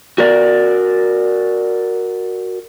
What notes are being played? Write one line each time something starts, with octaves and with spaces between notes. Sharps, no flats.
F#4 A#4 D5